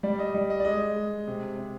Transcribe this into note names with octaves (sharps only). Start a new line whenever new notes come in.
G3 D5
D#5
G3 D5
D#5
D5
G#3 D#5
G#3
C3
C3